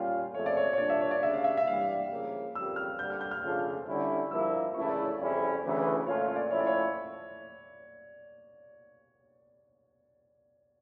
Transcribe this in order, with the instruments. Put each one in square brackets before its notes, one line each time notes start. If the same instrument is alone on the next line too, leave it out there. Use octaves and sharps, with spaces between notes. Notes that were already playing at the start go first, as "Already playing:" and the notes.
Already playing: [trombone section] A#2 G3 C#4 F4 [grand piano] G5 F6
[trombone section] F2 C#3 F3 A3 [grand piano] C#5
[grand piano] D5
C#5
C#5
[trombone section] A#2 G3 D4 [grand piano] D5
[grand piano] E5
C#5
D5
[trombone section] D2 C#3 G3 D4 [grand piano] E5
[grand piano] F5
E5
E5
[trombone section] G2 E3 G3 [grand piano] F5
[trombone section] C#3 F3 A#3
[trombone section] F2 C#3 G3 A#3 [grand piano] E6
[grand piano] F6
[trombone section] G2 D3 G3 [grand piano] G6
[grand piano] F6
G6
F6
[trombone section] C#3 F3 A3 D4 F4
D3 G3 C#4 E4
[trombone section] G2 F3 A#3 E4 [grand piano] E6
[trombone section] C#2 C#3 E3 A3 E4 [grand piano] C#6
[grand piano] D5
C#5
[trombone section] F2 C#3 G3 C#4 E4 [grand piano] D5
[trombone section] D2 C#3 E3
[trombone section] A#2 A3 C#4 F4 [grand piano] C#5
[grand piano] C#5
D5
[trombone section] A2 F3 C#4 E4 [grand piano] C#5
[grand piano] D5
C#5